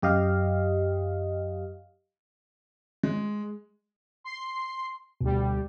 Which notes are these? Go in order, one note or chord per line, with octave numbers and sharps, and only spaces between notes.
F#2 G4 D#5 F5
G#3
C6 C7
D2 B2 G3